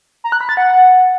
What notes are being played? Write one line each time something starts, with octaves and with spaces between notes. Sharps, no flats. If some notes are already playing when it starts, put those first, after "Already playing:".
A#5
F#6
B5
A6
F#5